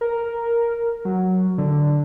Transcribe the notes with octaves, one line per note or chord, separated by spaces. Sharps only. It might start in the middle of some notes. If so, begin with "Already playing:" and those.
A#4
F#3
D3